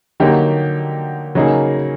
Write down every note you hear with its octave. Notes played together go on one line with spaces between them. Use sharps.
D3 F#3 A#3 D#4 G4
C#3 F#3 A#3 D#4 G#4